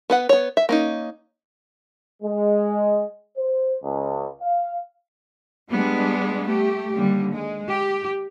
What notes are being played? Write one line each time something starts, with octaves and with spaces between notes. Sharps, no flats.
B3 B4 F#5
B3 C#5
E5
A#3 C#4 D#4
G#3
C5
C#2
F5
G3 G#3 B3 D4
A3 G4
D#2 D3 G3
G#3
G4